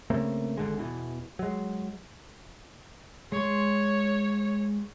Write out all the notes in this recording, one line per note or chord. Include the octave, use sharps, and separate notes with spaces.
C#3 A3 A#3 C4
G#1 D3 G#3
E2 B2 E3
F#3 G#3
G#3 C#5 C6